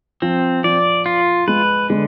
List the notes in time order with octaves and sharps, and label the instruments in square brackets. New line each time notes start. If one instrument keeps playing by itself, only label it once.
[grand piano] F3 [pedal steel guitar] C4
[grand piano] F3 [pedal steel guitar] D5
[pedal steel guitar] F4
[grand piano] G#3 [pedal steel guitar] B4
[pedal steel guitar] D3 [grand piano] G#3